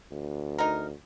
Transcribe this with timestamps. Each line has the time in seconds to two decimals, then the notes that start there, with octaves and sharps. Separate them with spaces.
0.11 D2
0.58 D#4 A#4